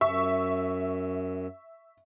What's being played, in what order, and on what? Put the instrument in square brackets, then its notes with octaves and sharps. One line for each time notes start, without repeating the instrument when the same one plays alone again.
[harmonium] F#2 [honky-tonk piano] E5 C#6